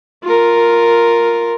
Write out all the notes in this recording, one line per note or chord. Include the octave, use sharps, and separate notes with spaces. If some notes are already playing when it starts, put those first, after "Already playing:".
F4 A#4